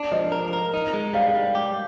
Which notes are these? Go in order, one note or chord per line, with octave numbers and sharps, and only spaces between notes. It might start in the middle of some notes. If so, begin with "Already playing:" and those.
Already playing: D4
F3 D#5
A#4
A#4
D#4
G#3
G3 F5
G3
G4